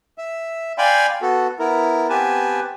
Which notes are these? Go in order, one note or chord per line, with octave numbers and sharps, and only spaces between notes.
E5
D5 F5 G5 G#5 B5 C6
B3 F#4 A4
B3 E4 A#4
B3 C4 G4 B4 G#5 A5